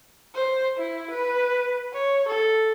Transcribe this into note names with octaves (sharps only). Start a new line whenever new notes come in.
C5
E4
B4
C#5
A4